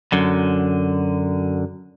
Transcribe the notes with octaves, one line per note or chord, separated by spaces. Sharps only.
F#2 D3